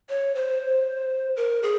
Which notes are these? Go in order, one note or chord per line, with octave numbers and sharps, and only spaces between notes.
C#5
C5
A#4
G#4